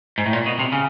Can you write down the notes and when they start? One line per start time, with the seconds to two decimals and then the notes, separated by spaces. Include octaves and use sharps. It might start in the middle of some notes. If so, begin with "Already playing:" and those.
0.18 G#2
0.26 A2
0.33 A#2
0.46 B2
0.59 C3
0.72 C#3